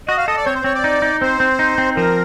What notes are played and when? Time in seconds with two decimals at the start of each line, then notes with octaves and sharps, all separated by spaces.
0.08 F#4 D#5
0.18 F5
0.27 A4 D#5
0.37 D5
0.46 C4 C#5
0.55 C5
0.64 C4 C#5
0.75 D5
0.84 D#4
1.02 D#4
1.22 C4 C5
1.40 C4
1.59 D#4
1.78 C4
1.96 F3 A#4